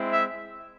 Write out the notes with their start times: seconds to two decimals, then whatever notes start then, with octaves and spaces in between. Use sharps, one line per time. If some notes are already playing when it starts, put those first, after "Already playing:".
Already playing: G#3 C4 E4
0.10 E5